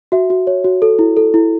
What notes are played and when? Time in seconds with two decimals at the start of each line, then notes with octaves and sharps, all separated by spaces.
0.12 F#4 E5
0.30 F#4
0.47 C#5
0.64 F#4
0.82 A4
0.99 E4
1.17 A4
1.34 E4